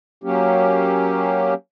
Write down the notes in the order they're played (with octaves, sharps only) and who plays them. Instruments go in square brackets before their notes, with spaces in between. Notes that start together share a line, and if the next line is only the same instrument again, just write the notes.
[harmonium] F#3 A#3 C#4 G4